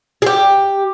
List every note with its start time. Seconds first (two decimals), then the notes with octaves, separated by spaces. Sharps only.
0.22 G#4
0.26 G4